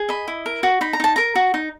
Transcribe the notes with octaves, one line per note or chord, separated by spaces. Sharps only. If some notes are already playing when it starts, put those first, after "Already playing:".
Already playing: G#4
D#5 B5
E4
A#4
F#4
D#4 B5
A#5
D#4 A5
A#4 A#5
F#4
D#4